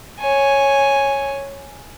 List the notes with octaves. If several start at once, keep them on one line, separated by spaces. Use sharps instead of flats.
C#5 G#5